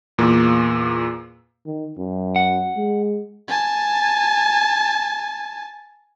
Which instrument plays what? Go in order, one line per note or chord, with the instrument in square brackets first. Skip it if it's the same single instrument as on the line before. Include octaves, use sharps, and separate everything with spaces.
[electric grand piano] E2 A#2 A#3
[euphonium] D#3
F#2
[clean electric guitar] F#5
[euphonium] G#3
[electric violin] G#5 A5